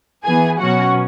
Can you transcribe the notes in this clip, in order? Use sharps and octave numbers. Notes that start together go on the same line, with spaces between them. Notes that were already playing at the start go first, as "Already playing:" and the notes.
E3 B3 G#4 G#5
B2 F#3 C#4 F#4 F#5